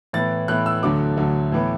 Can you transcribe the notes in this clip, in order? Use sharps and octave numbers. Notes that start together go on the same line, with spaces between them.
A2 E3 B3 A6
A2 E3 B3 F#6
E6
D2 D3 F#3 A3 D6
D2 D3 F#3 A3
A2 E3 B3